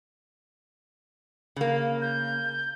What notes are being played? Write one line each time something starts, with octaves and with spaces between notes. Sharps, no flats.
C#3 A#3
G6